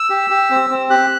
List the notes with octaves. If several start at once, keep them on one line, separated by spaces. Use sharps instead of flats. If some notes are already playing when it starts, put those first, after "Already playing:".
Already playing: E6
G4
G4
C4
C4
G4 F#6